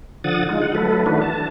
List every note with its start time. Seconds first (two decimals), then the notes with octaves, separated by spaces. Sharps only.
0.24 D3 F3 F#5 D#6 A6
0.49 G#3 D#4 F4
0.62 F#5
0.75 F#3 A3 A4 B4
1.06 D#3 E3 A3 D4 F#4 B4
1.22 A5